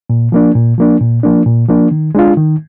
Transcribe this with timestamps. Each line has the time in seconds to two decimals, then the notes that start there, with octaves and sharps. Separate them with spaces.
0.10 A#2
0.32 F3 A#3 D4
0.55 A#2
0.78 F3 A#3 D4
1.01 A#2
1.23 F3 A#3 D4
1.46 A#2
1.68 F3 A#3 D4
1.91 D#3
2.15 G#3 D4 F4
2.37 D#3